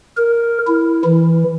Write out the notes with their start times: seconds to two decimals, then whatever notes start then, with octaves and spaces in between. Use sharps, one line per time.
0.17 A#4
0.67 E4
1.05 E3